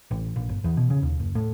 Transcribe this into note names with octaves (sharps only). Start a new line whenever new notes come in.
A1
A#1
G1
E2
B2
C#3
D#2
F#1
A2